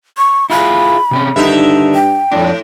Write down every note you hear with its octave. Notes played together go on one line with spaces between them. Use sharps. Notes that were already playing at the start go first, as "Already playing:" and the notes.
C#6
E4 F4 G#4 B5
C3 C4 C#4
G2 D3 D#3 D#4 E5
G5
F2 A2 D4